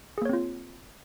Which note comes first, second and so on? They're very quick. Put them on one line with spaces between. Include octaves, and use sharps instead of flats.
G#4 A#3 C#5 C4 F4